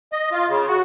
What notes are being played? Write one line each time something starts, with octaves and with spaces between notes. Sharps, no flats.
D#5
F4
C#3
F#4